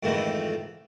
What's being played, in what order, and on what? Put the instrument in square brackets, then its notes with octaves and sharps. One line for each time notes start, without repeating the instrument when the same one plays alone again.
[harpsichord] F2 G#2 D#3 E3 A3